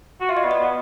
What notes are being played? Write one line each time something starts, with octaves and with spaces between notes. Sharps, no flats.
F#4
F4 E5
D#5
B3 D5
D#5
B3